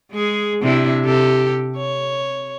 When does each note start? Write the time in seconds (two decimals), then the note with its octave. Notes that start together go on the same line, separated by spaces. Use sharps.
0.12 G#3 G#4
0.62 C3 D4 E4
1.05 C3 G4 A4
1.76 C#5